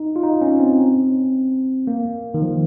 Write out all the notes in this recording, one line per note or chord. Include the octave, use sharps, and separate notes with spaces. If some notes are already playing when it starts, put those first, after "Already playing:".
Already playing: D#4
F4
D#4
C#4
C4
A#3
D#3
F3